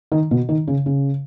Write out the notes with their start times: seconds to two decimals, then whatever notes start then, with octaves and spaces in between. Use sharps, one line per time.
0.12 D#3
0.31 B2
0.49 D#3
0.68 C#3
0.86 C#3